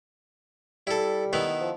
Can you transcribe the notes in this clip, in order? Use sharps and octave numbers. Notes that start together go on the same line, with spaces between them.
G3 E4 A4
D#3 B3 E4
F3